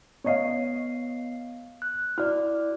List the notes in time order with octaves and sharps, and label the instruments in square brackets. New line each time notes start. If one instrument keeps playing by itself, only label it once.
[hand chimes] B3 C7 [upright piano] C#5 D#5 F5
[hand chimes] F#6
[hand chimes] E4 F#4 D5 [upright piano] F6